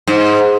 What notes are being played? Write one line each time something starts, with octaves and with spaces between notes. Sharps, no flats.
G#2